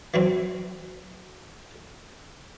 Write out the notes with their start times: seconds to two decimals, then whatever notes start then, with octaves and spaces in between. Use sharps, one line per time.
0.14 E3 F#3 C4